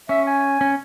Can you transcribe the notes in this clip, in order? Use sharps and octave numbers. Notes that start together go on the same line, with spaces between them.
C#4 E5
G#5
C#4